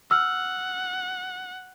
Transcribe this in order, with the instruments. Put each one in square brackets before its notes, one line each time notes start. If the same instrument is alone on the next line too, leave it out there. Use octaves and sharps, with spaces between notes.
[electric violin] F#5 [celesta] E6 F6